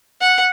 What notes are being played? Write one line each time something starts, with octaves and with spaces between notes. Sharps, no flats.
F#5